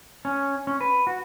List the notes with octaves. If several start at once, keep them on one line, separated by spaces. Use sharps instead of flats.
C#4
C#4
B4
F#4